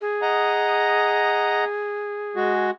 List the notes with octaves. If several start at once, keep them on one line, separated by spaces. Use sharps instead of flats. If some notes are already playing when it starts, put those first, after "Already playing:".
G#4
D#5 F#5 A#5
G#3 F#4